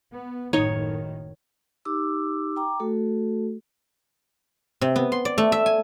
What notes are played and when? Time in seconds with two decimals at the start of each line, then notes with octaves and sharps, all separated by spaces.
0.12 B3
0.53 F#1 A2 D#3 D#4 C#5
1.85 D#4 G4 D6 E6
2.56 G5 A#5 D6
2.80 A3 F#4 A4
4.81 C3
4.96 B3
5.12 C6
5.25 D5
5.38 A3
5.52 E5
5.66 G#5